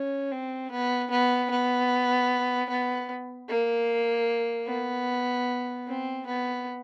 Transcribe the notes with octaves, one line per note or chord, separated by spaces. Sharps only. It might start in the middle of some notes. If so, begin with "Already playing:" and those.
Already playing: C#4
C4
B3
B3
B3
B3
A#3
B3
C4
B3